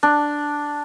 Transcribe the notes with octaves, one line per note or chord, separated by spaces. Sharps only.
D4